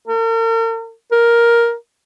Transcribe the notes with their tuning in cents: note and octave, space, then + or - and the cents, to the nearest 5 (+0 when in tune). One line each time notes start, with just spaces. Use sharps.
A#4 -45
A#4 +10